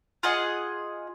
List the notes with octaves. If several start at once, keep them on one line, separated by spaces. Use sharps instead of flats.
F4 G#4 D#5 F#5